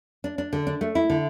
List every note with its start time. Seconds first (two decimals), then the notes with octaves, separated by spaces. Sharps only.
0.24 D4
0.38 D4
0.53 D3
0.67 D4
0.81 A3
0.95 E4
1.10 D3